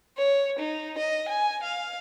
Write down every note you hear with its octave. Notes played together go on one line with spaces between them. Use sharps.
C#5
D#4
D#5
G#5
F5